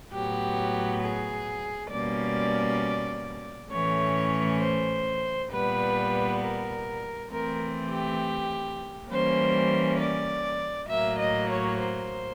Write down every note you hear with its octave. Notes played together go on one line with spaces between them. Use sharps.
A2 F#3 B3 G4
G#4
B2 G3 A#3 C#4 D5
A2 E3 A3 C#4 C#5
C5
A#2 G3 B3 B4
A#4
E3 A3 C4 A#4
G4
E3 G3 A#3 C#4 C5
D5
A2 F#3 A#3 E5
D#5
C#5
C5